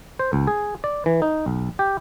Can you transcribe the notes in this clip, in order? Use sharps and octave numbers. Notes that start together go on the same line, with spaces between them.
C5
C#2
G#4
D5
E3
D#4
B1
G4